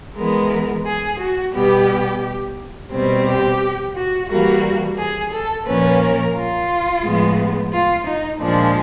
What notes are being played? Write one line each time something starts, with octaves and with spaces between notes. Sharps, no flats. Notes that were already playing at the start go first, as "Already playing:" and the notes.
E3 G#3 B3 A#4
G#4
F#4
B2 G3 B3 G4
B2 G3 C4
G4
F#4
E3 G3 A#3 F#4
G#4
A4
A#2 F3 A#3 C#4 B4
A#4
F4
A2 F3 G#3 B3
F4
D#4
A#2 F3 G#3 D4